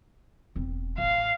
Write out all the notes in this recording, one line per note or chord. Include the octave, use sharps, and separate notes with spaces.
E1 C4
A1 F5